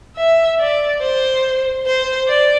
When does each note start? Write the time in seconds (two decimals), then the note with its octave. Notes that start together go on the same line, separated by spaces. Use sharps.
0.16 E5
0.60 D5
1.02 C5
1.86 C5
2.28 D5